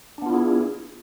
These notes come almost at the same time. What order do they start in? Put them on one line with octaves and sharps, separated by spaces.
D4 B3 F4 E4 G#4